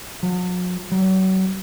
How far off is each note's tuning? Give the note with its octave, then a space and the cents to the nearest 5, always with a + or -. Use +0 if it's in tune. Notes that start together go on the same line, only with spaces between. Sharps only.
F#3 -45
F#3 +35